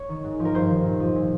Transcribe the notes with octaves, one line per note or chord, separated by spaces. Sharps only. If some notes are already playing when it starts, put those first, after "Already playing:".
Already playing: C#5
D#3
G#2
F3
A#4
G2 C5
D#3
A#2
F3
A#2